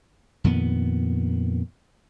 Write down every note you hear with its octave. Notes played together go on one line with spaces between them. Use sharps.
F2 A#2 D#3 B3